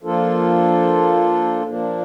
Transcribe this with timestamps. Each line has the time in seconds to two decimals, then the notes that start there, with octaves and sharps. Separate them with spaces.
0.03 F3 A#3 D4 F4 A4
1.64 A#2 F3 A#3 D4